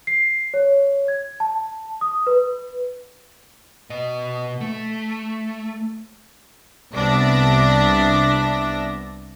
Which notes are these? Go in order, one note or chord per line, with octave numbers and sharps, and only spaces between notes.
C7
C#5
G#6
A5
D#6
B4
B2 D#5
A3
C2 B3 D4 D5 E5 A#6